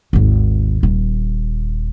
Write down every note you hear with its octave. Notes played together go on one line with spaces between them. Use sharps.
G#1 D#2
D#1